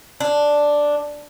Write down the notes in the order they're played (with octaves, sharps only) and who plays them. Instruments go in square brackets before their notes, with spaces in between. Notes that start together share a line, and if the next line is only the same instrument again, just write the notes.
[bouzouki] D4